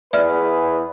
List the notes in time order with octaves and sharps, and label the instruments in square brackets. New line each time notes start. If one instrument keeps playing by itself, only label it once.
[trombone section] E2 G#4 B4 [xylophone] D5 E5 F6